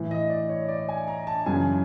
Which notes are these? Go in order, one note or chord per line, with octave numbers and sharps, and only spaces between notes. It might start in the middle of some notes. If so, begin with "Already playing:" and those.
Already playing: A2 E3
D#5
D5
C#5
D5
G#5
A#5
A5
F#2 C#3 E3 G#5